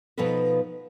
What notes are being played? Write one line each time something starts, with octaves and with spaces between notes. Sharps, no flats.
B2 F3 D#4 F4 A4 B4